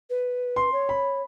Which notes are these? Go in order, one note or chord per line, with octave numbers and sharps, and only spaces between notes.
B4
C6
C#5
B5